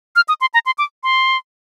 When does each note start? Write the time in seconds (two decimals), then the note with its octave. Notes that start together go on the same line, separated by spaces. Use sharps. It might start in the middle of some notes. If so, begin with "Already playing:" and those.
0.16 F6
0.28 D#6
0.41 C6
0.54 A#5
0.66 C6
0.78 D6
1.03 C6